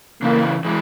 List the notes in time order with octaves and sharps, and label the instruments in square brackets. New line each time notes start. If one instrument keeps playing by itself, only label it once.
[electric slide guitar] C#3 E3 [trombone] A#3
[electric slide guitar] E3 G#3